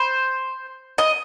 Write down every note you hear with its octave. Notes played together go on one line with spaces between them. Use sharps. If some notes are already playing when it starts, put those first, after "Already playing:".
Already playing: C5
D#5